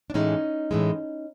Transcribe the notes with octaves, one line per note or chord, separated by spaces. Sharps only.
D4
A2 E3 G#3 C#4 D#4
A2 E3 G#3